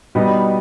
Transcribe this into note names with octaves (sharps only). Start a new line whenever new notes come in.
B2 G3 B3 D#4